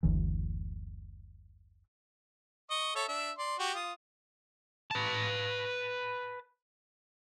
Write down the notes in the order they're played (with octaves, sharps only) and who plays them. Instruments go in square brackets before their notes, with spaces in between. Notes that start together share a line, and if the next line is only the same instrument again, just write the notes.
[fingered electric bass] F#1 D2 E3
[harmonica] D#5 C#6
A4 C#5 E5
D4 E5
D5 C6
F#4 G4
F4 D#6
[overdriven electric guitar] B4 A5